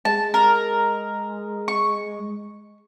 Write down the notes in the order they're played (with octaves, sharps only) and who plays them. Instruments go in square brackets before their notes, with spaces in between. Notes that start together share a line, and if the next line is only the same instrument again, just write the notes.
[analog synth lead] G#3 [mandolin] A5
[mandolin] A#4
C#6